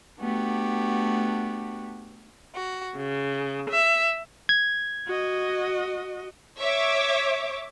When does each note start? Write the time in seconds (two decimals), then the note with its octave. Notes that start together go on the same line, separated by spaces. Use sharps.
0.20 A3 B3 D4 F#4 G4
2.54 F#4
2.97 C#3
3.70 E5
4.49 G#6
5.07 F#4 D#5
6.59 C#5 E5 D6